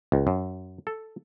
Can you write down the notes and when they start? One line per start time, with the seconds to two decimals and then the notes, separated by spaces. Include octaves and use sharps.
0.12 C#2
0.27 F#2
0.87 A4